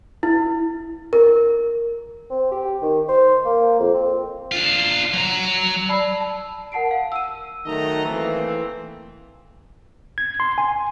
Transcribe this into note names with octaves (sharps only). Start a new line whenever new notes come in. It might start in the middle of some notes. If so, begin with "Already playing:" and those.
E4
A#4
C4
G4
D#3
C5
A#3
F2
C4
D4 F4
F#3 A#5
D5 A5 B5 E6 C7
A5
A#4 F#5 A5 C7 D7
F5
E6 D#7
D#3 F#3 A3 D#5 A#5
E3 A3 A#3 C4
G#6
C6
G#5